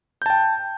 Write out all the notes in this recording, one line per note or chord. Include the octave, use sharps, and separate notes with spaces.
G5 A5 G6